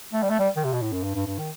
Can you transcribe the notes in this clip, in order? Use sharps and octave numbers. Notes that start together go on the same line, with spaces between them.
A3
G3
A3
G3
D#3
C3
B2
A2
F#2
G2
G2
G2
D#3